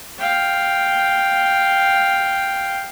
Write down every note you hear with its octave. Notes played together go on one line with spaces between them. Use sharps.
F5 G5